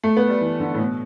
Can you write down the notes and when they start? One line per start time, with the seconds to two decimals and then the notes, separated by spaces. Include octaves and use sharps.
0.04 A3
0.17 B3
0.29 G3
0.41 E3
0.60 D3
0.74 A2
0.78 B2